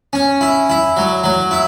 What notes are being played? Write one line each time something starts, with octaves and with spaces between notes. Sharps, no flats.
C#4
E4
E4
F#3
F#3
E4